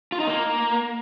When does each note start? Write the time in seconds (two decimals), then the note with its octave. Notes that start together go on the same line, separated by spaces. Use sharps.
0.12 F4
0.20 D#4
0.27 A#3